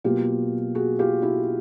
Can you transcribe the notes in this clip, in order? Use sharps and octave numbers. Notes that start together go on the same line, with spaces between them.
B2 F#3 A#3 F4 G4
F#4 G#4
F4 G4
E4 F#4